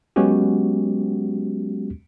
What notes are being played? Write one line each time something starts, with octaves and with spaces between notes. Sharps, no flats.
F#3 G#3 B3 C#4 F#4 G4